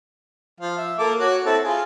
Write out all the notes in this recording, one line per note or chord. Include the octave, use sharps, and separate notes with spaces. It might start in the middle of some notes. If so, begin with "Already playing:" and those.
F3 F5
E5
A#3 A4 D6
F#4 C#5
C4 E4 A4
F4 G#4